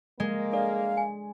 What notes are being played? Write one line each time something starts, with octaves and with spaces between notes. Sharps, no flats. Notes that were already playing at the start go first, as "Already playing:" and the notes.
G#3 A#3 G#4
D4 A4 D5 F5
G#5